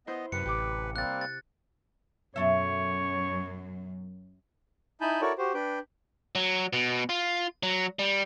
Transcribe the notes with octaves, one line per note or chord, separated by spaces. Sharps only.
B3 E4 C5 D#5 G6
F#2 C3 B4 C#7
A1 G4 D6
G3 A#3 C4 F#6 A6
A6
F#2 B2 A4 C#5 E5
D#4 E4 G#5 A5 B5 G6
E4 F#4 A4 A#4 C#5 D5
F#4 G4 C5
D4 B4 G5
F#3
B2
F4
F#3
G3